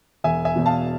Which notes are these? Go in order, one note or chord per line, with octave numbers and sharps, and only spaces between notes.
E1 E5 G#5
E5 G#5
E2 B2
F5 A5